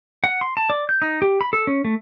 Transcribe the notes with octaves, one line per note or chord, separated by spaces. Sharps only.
F#5
C6
A5
D5
G6
D#4
G4
B5
A4
C#4
A3